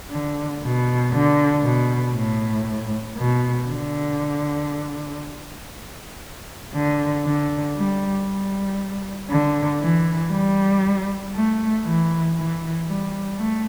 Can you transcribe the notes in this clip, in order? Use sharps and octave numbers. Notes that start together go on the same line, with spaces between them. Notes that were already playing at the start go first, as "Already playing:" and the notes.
D3
B2
D3
B2
A2
B2
D3
D3
D3
G3
G3
D3
E3
G3
A3
E3
E3
G3
A3